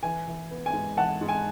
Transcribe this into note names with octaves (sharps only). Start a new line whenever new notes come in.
E3 G#5
E3
B3
G#5
G#2
E3 F#5 A5
G#2
G#5